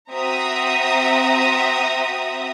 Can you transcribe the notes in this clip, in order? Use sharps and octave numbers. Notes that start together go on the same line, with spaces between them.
C4 F#4 E5 A#5 D#6